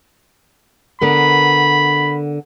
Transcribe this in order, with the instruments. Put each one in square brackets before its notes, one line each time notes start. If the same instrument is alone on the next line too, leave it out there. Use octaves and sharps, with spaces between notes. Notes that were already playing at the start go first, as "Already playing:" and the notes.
[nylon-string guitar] D3 B3 A#4 [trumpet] B5